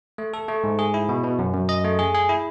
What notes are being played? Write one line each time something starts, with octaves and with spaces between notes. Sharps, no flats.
A3
A4
A3
G#2
G#4
E4
B2
B2
F#2
F#2
D#5
A3
G#4
G#4
E4